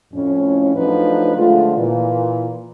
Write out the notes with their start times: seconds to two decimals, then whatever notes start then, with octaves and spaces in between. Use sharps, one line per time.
0.14 F2 A2 C#4
0.75 F3 F#3 A3 D4 D#4 B4
1.36 D3 F3 G#3 A3 F4
1.77 A#2 E3